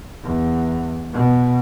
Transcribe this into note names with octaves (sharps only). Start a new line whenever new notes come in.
E2
B2